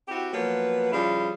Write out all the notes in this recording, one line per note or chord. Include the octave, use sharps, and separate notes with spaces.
C4 E4 F#4 G4
F3 F#3 A#3 B3 B4
C#3 F3 G3 E4 G#4 F5